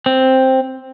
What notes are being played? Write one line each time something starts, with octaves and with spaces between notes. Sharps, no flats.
C4